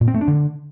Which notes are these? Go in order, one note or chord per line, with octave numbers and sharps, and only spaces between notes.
A#2
C4
A3
D4
D3